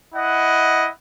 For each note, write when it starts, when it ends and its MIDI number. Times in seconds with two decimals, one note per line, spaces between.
0.14 0.88 64
0.14 0.88 75
0.14 0.88 78